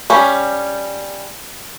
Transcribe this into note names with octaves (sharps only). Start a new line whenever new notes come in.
G3 C#4